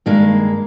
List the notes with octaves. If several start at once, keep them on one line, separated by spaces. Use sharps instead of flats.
G2 D#3 G#3 A#3